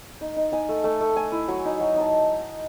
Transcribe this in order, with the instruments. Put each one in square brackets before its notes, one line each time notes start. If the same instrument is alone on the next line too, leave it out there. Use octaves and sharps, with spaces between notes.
[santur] D#4
D#4
D#4 G#5
A3
A3 A5
A3
A3 G#5
E4
F#3 G#5
D#4
F#3
D#4 A5